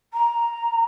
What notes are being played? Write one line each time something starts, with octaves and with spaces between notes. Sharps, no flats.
A#5